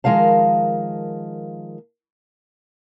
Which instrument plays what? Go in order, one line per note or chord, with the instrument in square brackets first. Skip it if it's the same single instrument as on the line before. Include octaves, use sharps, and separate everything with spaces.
[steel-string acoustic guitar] D#3 F3 G#3 A#4 F5 A5